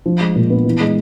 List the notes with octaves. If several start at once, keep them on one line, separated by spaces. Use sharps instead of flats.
F3
G#3
A#2
B3
E3
G#3